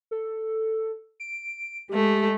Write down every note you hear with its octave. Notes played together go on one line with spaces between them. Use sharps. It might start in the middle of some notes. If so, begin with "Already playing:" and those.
A4
D7
G#3 A3 G4